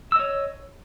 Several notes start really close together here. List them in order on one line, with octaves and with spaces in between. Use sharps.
E6 D#5 C#5